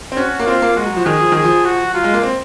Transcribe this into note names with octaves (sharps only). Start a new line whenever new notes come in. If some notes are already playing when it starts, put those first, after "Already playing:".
C4
C#4 F#4
A#3
C4 F4
A#3
G#3 F#4
F#3
F3
D#3 G#4
F3
D#3 G#4
F3
F#4
F#3 F4
G#3
A#3
C4